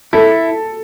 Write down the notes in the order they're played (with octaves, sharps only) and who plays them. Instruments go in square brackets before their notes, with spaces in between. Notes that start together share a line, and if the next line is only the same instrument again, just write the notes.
[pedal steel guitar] E4 [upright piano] A4